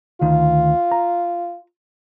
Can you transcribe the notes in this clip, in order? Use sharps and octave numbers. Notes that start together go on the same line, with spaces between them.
D2 D#3 F4
A#5